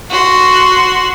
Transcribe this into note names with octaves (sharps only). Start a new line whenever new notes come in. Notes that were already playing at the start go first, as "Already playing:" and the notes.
F#4 C6